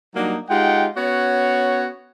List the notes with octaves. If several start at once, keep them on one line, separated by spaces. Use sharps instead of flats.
F#3 G3 A#3 D4 D#4
G#3 D#4 F4 G4 F#5 G5
B3 C#4 F#4 C#5